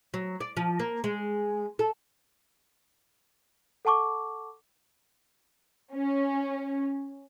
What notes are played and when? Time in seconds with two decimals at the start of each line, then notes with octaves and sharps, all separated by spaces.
0.14 F#3
0.41 D5
0.57 F3
0.80 A#3
1.04 G#3
1.79 A4
3.85 A4 F#5 A5 C#6 D6
5.93 C#4